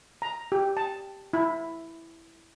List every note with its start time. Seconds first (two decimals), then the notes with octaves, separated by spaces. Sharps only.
0.22 A#5
0.52 G4
0.77 A5
1.33 E4